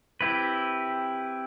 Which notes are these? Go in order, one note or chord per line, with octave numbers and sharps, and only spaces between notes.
C4 E4 G4 B4